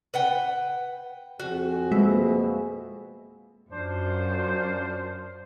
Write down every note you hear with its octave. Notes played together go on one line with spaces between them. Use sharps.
B4 F#5 G5
F2 C4 F#4 G#4
B2 G#3 A#3 E5
F#2 D4 F4 C5